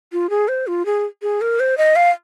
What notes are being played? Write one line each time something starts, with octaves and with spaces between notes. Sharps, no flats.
F4
G#4
C5
F4
G#4
G#4
A#4
C5
D#5
F5